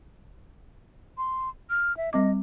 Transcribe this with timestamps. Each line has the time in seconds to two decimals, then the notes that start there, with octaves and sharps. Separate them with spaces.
1.18 C6
1.70 F6
1.97 E5
2.13 G3 C4 D#5 D6